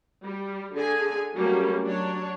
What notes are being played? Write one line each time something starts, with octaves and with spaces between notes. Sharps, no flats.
G3
D3 G#4 G#5
F#3 G3 A3 A#3 C#4
F#3 D4 C#5